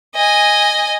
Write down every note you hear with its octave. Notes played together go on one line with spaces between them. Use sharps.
D#5 G#5